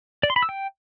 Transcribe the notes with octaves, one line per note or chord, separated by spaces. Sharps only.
D5
C6
B5
E6
G5